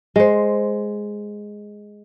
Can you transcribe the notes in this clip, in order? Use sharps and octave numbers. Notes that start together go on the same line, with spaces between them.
G#3 C5